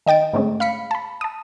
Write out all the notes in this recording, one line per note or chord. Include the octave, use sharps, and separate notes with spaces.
D#3 D#5 G5 A6 D7
G#2 D3 A3 C4 C#4 G#4
F5 B5 B6 C#7
A5 B5
A5 D#6